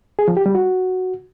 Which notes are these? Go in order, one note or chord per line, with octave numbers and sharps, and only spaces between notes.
G#4
F3
G4
G3
F#4